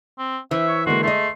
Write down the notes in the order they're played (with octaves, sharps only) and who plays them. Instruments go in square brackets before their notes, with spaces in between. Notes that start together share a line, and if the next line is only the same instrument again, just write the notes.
[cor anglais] C4
[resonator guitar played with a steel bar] E3 [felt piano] C5 [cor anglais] E5
[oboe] C#5
[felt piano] D3 G#3 A#3 [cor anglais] F#4 [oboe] C6
[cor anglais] A3 [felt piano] G#4 D#5 [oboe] C6